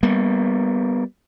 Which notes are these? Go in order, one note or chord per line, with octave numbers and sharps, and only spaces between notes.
G3 A#3 B3